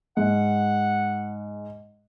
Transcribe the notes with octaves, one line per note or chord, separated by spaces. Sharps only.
G#2 F#5